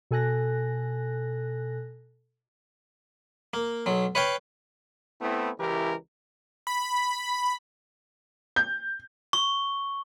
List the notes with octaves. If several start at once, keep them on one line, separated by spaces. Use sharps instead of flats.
B2 A4 G#5 F#6 A#6
A#3
B1 F#3
B4 C#5 F5 G5
A3 B3 C4 E4
C#2 E3 E4 G4 A#4
B5
G6
C#6